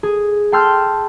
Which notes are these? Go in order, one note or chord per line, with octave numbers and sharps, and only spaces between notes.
G#4
G5 A5 C6 E6 F6 G6